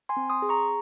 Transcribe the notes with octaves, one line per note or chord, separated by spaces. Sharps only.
G#5 C6
C4
C6 D#6
G#4
A#5 C#6